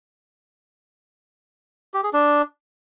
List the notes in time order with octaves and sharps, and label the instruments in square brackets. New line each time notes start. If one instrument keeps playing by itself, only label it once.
[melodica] G4
G#4
D4